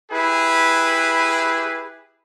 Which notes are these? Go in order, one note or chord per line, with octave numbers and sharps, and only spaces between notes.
E4 G4 G#4 B4